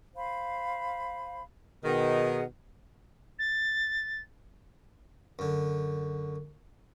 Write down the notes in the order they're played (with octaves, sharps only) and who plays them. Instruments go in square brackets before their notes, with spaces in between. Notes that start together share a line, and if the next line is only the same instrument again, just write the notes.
[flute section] C5 F5 B5
[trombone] B2 [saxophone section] D#3 [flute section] G#4 D#5 F#5
[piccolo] A6
[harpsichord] F#2 D3